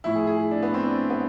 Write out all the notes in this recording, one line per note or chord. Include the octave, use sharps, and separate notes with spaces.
A2 F3 E4
G#4
G#4
D4
B3
C4
D4
B3